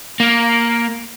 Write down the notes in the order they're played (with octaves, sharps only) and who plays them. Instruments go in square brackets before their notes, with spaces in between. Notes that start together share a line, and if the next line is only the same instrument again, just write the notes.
[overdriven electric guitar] A#3